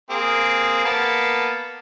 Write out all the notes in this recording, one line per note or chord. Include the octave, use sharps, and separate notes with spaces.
A#3 C4 G#4
A#3 B3 A5